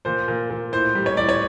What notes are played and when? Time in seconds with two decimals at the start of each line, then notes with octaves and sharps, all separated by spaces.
0.05 A#2 C5
0.28 A#2
0.50 A#2
0.72 A2 C5
0.95 G3
1.06 C#5
1.17 A2 D5
1.29 C#5